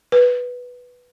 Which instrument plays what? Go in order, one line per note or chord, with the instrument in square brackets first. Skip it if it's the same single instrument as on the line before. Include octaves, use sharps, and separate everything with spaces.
[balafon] B4